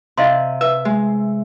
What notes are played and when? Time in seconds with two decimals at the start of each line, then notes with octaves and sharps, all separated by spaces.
0.18 C3 D#5 F5 C6
0.61 B4 E5
0.85 G#3